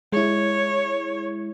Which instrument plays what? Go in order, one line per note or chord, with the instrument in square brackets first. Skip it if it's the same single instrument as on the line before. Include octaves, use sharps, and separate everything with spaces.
[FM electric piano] G#3 E4 [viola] C#5